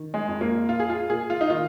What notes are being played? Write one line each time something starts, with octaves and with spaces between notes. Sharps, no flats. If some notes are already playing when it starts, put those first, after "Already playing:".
Already playing: D#3
G#3
F2
A#3
A#2 F4
G#4
F4
A#2 G#4
F4
D#4
D#3 F4